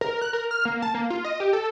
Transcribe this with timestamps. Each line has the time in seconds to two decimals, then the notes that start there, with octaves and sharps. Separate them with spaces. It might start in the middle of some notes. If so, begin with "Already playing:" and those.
0.01 A#4
0.22 F#6
0.33 A#4
0.51 F6
0.65 A#3
0.82 A5
0.95 A#3
1.10 F4
1.24 D#5
1.40 G4
1.53 A4